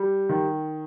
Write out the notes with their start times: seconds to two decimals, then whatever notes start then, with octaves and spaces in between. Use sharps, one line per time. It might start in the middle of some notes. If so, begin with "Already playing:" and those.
Already playing: G3
0.29 D#3